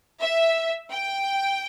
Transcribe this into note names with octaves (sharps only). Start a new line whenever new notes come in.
E5
G5